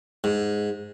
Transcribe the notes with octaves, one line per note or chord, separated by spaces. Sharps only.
G#2